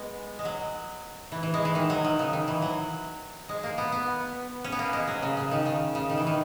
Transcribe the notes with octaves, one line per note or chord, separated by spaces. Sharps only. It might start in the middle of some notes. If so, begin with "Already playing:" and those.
Already playing: G#3 B3
G#3
F#3
E3
E3
G#3
E3
D#3
F#3
D#3
C#3
D#3
E3
F#3
G#3
A#3
B3
B3
C#4
B3
A#3
G#3
F#3
C#3
C#3
D#3
C#3
C#3
D#3
E3
D#3